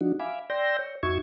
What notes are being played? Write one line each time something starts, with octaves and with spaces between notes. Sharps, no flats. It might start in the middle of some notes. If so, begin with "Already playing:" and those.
F3 D4 D#4 F#4
E5 F5 G#5 B5 D6
D5 G5 C6 E6 G6 A#6
C#5
F2 D#4 F#4 E5 C#6 G#6